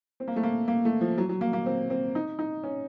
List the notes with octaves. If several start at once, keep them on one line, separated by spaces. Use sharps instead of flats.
C4
A#3
A3
A#3
A#3
A3
F3
F#3
F#3
A#3
A#3
C4
C4
D#4
D#4
C#4